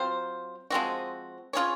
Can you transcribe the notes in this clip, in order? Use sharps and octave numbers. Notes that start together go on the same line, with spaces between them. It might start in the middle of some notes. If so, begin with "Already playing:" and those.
Already playing: F#3 C4 F4 C5
F3 G#3 C4 F#4
C#4 F4 G#4 C#5